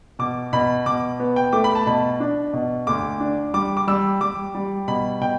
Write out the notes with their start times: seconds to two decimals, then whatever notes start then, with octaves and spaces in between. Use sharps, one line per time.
0.19 B2 D6
0.53 B2 B5
0.86 B2 D6
1.20 B3
1.36 G5
1.53 A3 D6
1.64 B5
1.75 A5
1.87 B2 B5
2.20 D4
2.53 B2
2.87 D2 D6
3.20 D4
3.54 G3 D6
3.77 D6
3.87 G3 E6
4.21 G3 D6
4.55 G3
4.88 B2 B5
5.21 B2 G5